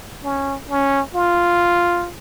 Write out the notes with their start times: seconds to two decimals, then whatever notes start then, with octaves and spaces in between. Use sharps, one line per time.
0.24 C#4
0.70 C#4
1.15 F4